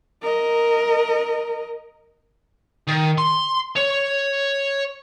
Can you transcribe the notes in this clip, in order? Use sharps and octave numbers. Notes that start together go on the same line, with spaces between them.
A#4 D#5
D#3
C6
C#5